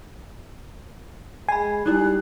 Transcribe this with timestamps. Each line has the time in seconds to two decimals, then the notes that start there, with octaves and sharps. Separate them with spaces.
1.49 G#3 G#5 B5 C7
1.86 G3 D#4 E4 F#6